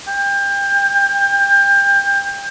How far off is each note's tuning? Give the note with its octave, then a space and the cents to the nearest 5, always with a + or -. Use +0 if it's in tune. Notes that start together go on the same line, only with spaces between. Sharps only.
G5 +25